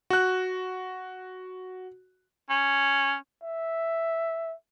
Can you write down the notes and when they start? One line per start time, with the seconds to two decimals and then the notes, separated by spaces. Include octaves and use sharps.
0.10 F#4 F#6
2.50 C#4
3.43 E5